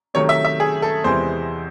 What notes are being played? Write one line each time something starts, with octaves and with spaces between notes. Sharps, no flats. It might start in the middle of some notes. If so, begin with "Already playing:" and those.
C3 D#3 F#3 A3 C#5
E5
E5
G#4
A4
E2 C3 E3 G#3 C4 C5